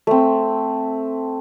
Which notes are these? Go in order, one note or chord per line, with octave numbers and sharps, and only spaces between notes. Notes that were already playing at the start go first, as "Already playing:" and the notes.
A3 C4